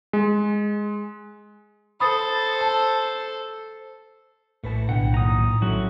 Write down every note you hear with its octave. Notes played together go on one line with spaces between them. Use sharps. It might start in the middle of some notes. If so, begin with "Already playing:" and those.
G#3
A4 C5 B5 D#6 A6
A5
A#1 A2 A3 B4 A5
B1 D3 F#5 G5
F#2 A#2 D#3 A#5 D#6
F#3 C#4 E4 F#4 A4